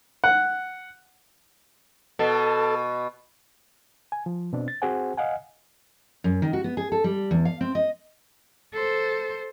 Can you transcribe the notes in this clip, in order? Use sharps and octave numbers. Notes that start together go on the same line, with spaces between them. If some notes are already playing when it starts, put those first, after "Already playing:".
F#5
B2 A4
G#5
F3
B2 C4 D4
A6
C4 F#4 G#4 C5 F#5 G#5
D#5 F5 F#5 G#5
F#2
D#3
F#4
B3
G#4
A4
G3
E2
F5
C4
D#5
A4 C5